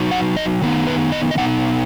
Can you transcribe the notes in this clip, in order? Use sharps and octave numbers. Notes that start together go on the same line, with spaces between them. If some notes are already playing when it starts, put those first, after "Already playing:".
Already playing: F#3 D#4
F#5
D#5
D#3 B3 D#4
B4
D#5
D#5
B2 B3 D#4 F#5